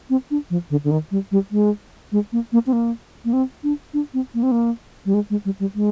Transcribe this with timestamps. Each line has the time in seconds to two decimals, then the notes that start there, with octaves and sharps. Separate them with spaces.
0.10 C4
0.31 D4
0.50 F3
0.70 D3
0.84 D3
0.91 D#3
1.11 G3
1.31 G3
1.51 G#3
2.12 G#3
2.32 A#3
2.52 A#3
2.67 C4
2.73 A#3
3.25 A#3
3.33 C4
3.64 D4
3.94 D4
4.14 C4
4.34 A#3
4.43 C4
4.52 A#3
5.06 G3
5.14 G#3
5.30 G#3
5.45 G3
5.60 G3
5.75 G#3